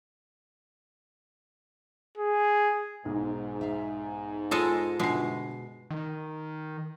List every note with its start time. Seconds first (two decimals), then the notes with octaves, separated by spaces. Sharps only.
2.18 G#4
3.05 B1 G#2
3.61 E5 F5
4.51 G#3 F4 A4 D#5
5.00 G1 B2 G#3 C7
5.91 D#3